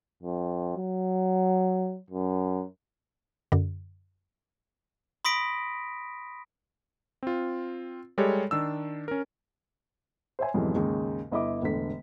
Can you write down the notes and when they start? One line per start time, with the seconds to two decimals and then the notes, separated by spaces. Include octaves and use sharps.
0.23 F2
0.77 F#3
2.10 F#2
3.52 F#2 D3
5.25 B5 C6 D#6 A#6 B6 D7
7.23 C4 F4
8.18 G3 G#3 G4 A4 C#5
8.51 D#3 D4 E6
9.08 C#4 A#4
10.39 C5 C#5 E5 G#5
10.54 F2 G#2 B2 E3 F#3 G3
10.76 D#2 G#2 C#3
11.32 G1 E4 D#5 E5 B5 D6
11.62 E1 A2 D3 B6